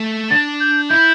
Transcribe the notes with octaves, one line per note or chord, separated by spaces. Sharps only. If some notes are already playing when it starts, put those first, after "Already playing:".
Already playing: A3
D4 A6
G6
E4 G6